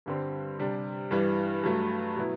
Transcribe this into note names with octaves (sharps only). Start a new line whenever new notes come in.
G2 D3 G3 C4
C3 G3 D4
G2 E3 G3
G2 F#3 A3
B2 F#3 B3 E4